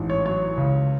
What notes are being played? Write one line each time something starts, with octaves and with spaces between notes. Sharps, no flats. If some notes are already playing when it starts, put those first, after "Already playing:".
Already playing: A1 G#2
C#5
F#3 C#5
C#2